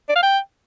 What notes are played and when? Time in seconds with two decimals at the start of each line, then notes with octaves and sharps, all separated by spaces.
0.09 D5
0.16 F5
0.23 G5